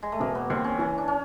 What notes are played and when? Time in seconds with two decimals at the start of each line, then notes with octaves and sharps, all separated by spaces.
0.03 G#3
0.12 A3
0.20 E1 A#3
0.35 B3
0.50 D#2 C4
0.64 C#4
0.79 E3 C#4
0.98 D4
1.08 C#4